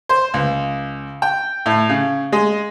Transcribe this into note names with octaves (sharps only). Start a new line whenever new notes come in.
C5
C#2
G5
A2
C#3
G#3